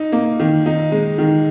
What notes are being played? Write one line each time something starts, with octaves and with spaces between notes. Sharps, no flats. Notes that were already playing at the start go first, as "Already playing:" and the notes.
Already playing: D#4
A#3
D#3
D#4
G#3
D#3